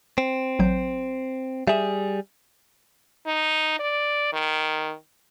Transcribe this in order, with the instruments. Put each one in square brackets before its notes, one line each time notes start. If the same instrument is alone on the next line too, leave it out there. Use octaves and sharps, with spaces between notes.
[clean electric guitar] C4
[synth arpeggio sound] A1 F#3 G6
[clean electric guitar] G3 G#4 [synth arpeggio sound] E5 E7
[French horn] D#4
D5
D#3